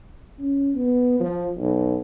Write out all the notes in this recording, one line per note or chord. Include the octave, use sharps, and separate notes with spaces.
C#4
B3
F3
B1